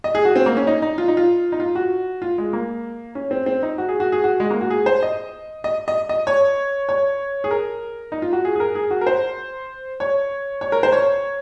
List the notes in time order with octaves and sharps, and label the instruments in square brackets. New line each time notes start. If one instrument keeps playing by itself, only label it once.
[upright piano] D#5
G#4
F#4
C4
A#3
C#4
D#4
D#4
F4
D#4
F4
D#4
F4
F#4
F4
G#3
A#3
C#4
C4
C4
D#4
F#4
G#4
F#4
G#4
F#4
G#3
A#3
F#4
G#4
C5
D#5
D#5
D#5
D#5
C#5
C#5
G#4
A#4
D#4
F4
F#4
G#4
G#4
A#4
G#4
F#4
A#4
C5
C#5
C#5
A#4
C5
C#5